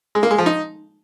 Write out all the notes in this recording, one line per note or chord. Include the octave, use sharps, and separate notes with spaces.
G#3
A#3
G#3
F3
D#4